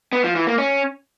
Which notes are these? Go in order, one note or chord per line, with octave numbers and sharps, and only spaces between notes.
B3
F3
E3
A#3
C#4